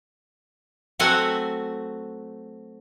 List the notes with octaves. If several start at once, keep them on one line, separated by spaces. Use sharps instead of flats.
F#3 A3 C4 F#4 F#5 G#5